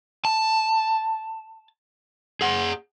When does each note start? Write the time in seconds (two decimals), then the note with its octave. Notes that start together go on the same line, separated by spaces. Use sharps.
0.25 A5
2.41 G#4 F#5